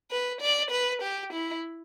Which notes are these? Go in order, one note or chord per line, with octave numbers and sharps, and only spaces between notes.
B4
D5
B4
G4
E4